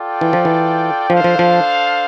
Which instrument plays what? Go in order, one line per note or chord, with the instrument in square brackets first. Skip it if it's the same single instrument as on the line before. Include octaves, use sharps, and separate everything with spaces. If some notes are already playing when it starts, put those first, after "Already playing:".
Already playing: [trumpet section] F4 A4 D5 G5
[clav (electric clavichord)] E3
F3
E3
[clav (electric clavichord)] F3 [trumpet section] D4 A4 C5 F5
[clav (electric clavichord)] F3
F3